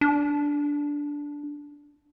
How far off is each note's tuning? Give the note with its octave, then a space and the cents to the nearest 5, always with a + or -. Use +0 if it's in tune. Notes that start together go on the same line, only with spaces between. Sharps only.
D4 -10